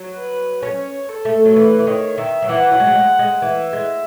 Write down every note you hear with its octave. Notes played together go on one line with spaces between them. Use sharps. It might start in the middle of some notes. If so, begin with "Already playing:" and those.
Already playing: F#3
B4
C#4 C#5
A4
A3
F#3
E3 B4
E3
D#3 C#5
D#3 E5
F#3
E3 F#5
F#3
G#3
F#3
G#3
G#3
E3 E5
G#3